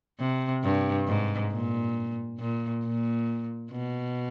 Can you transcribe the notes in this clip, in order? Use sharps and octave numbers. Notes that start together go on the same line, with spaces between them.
C3
G2
G#2
A#2
A#2
A#2
B2